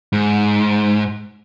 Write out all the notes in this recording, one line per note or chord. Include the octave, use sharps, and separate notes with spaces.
G#2